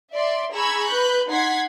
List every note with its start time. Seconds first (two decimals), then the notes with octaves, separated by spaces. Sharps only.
0.12 D5 E5 C6
0.52 G#4 A#5 B5 C#6 E6 G#6
0.90 B4 B5 F#6 G6
1.30 D#4 F#5 C6 G#6 B6 C7